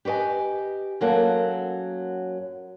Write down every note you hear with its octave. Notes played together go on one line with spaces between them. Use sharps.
G4 B4 C#5 D#5 G#5
F#2 F#3 A#3 A4